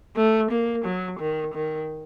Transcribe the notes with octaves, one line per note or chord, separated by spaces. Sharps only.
A3
A#3
F#3
D#3
D#3